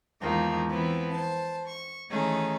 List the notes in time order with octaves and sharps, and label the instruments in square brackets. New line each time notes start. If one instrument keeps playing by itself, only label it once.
[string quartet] E2 G#2 D#3 F3 A#3
E3 F3 B3 C4 E4
C5 A5
C#6
D#3 E3 A3 C#4 D#4 G#4